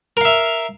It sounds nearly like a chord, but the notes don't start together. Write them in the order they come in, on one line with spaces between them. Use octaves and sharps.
A#4 F5 E5